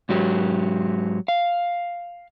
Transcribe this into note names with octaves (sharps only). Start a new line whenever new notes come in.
G#2 F#3 G4
F5